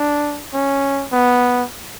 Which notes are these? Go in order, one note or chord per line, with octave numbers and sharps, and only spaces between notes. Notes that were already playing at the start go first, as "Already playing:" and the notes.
Already playing: D4
C#4
B3